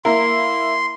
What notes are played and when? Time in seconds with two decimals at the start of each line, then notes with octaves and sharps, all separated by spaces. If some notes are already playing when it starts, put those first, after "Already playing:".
0.05 A#3 E4 A#4 C6